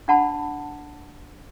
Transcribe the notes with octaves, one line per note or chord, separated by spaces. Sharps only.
D4 F#5 A5 B5